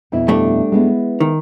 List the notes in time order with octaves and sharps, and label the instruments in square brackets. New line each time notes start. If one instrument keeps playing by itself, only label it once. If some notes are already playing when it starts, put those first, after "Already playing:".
[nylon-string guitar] F2 B2 E4
[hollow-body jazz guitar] G2 A3 D4
[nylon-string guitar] G#3 B3 E4
[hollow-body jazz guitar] D#3